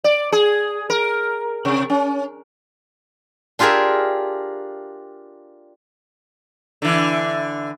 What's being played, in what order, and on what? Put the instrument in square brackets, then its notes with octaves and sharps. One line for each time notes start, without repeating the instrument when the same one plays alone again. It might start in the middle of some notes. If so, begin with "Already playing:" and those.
[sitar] D5
G#4
A#4
C3
C#4
[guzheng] D4 F4 G4 G#4 A#4 E5
[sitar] D3 E3